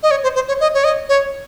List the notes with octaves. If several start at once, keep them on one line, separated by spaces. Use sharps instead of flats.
D#5
C#5
C5
C5
C#5
D#5
C#5
D#5
C#5